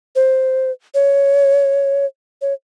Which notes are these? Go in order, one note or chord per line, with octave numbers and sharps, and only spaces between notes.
C5
C#5
C#5